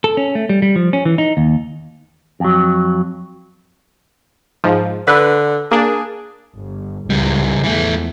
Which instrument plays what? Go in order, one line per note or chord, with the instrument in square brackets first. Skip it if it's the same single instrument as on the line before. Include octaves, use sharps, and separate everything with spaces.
[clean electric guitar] A4
C#4
A3
G3
G3
F3
C#4
E3
D#4
D#2
F2 F#3
[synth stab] G#2 F3
[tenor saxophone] D3 [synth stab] B4
[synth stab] A#3 D4 [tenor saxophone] G#4
[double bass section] G1
[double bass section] C#2 A2 [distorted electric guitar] C#3 G3
[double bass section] E2 F3 [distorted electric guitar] E3 A3